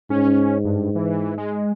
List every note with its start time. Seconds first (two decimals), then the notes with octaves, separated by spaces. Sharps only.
0.10 G#2 C#4
0.65 G2
0.95 E3
1.38 G#3